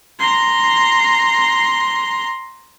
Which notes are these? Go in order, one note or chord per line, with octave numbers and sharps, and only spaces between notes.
A#5 C6